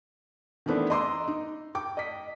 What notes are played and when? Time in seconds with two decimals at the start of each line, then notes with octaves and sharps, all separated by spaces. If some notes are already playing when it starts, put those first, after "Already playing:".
0.66 D#3 E3 A3 B3 C4 D4
0.90 D#5 A#5 C6 D6 E6
1.28 D#4
1.75 G5 D6
1.97 D#5 B6